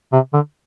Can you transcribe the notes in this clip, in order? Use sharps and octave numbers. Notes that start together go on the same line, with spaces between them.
C3
D3